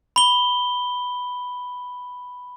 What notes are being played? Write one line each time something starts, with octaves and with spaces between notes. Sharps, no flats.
B5 G7